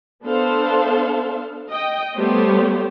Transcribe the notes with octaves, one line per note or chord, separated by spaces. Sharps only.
B3 D4 A4 C5 F5
D#5 G5
G3 A3 B3 G4 C5 C#5